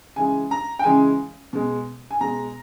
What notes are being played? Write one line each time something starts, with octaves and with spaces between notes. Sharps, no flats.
C#3 E3 G#3 G#5
A#5
G5
C#3 E3 G#3 G#5
B2 G#3
G#5
B2 G#3 A#5